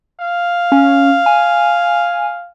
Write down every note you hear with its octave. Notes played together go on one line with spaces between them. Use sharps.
F5
C#4
G#5